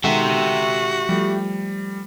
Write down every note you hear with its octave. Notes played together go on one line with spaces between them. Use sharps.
D#3 G#3 F#4 G4 A4 E5 F#5
F3 G3 A3